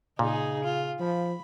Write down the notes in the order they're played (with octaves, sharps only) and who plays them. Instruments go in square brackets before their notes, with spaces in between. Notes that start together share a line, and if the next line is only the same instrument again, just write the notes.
[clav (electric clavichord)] A#2 [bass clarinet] C#3 [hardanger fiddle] D#4 G#4
[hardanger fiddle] F4
[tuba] F3 [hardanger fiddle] B5